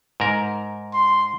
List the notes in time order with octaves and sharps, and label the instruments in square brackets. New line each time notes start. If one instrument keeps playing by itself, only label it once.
[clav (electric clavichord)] G#2 A#4
[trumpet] C6